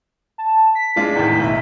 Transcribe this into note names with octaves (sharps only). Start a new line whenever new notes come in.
A5
B6
G#3 D4 F4
E2 A2 D#3
B1 E5